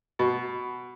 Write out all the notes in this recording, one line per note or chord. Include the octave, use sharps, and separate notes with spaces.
B2